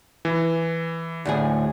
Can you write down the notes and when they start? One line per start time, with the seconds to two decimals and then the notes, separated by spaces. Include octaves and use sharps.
0.25 E3
1.25 D2 A2 G#4